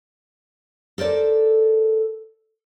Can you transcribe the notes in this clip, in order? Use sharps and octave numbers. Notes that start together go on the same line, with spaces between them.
A4 A#4 C5 D5